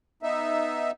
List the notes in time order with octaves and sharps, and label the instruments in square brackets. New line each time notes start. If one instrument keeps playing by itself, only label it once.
[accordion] B3 D#4 E5